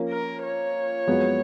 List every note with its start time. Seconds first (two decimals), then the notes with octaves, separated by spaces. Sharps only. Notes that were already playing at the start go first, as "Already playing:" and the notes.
Already playing: F3 A#3 C#4
0.09 A#4
0.42 C#5
1.07 F#2 F3 G#3 B3 F4